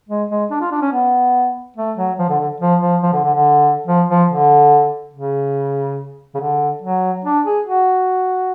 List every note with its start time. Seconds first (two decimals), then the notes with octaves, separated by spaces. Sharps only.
0.09 G#3
0.29 G#3
0.51 D4
0.61 F4
0.71 D4
0.82 C#4
0.92 B3
1.77 A3
1.97 F#3
2.19 F3
2.29 D3
2.40 D3
2.61 F3
2.81 F3
3.03 F3
3.13 D3
3.24 D3
3.34 D3
3.87 F3
4.09 F3
4.29 D3
5.14 C#3
6.35 C#3
6.40 D3
6.82 F#3
7.25 D4
7.45 G#4
7.67 F#4